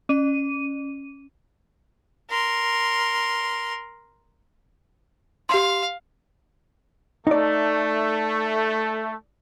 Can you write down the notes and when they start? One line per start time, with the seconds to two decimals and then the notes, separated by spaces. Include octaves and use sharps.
0.09 C#4 D#7
2.30 A#4 C6
5.49 G4 F5 C6
7.27 A3 D#4 D5